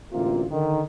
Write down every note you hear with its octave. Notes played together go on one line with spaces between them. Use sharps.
A1 D2 C3 A#3 F4
D3 D#3